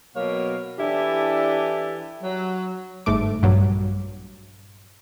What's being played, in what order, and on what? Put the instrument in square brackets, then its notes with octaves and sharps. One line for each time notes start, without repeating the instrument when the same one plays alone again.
[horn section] B2 F#3 A#3 C#5 F5
E3 D4 E4 G4 A4
F#3
[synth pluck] G1 G#2 A3 D6
A#1 G2 F#3